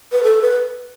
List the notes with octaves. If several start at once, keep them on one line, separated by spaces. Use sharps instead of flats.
B4
A4
B4